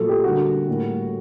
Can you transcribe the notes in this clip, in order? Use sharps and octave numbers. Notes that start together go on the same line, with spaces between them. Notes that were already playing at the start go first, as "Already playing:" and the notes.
Already playing: A#2 F#3 A3 A4
G4
D3 G3 A#3 F#4
A2 G3 A#3